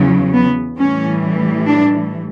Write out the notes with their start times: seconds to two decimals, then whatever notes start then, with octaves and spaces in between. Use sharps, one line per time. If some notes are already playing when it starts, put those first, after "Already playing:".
Already playing: E2 C#3 F#3
0.34 B3
0.78 A2 E3 G3 C#4
1.67 D4